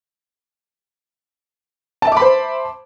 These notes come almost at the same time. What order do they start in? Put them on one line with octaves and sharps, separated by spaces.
A5 E5 D6 B5 C5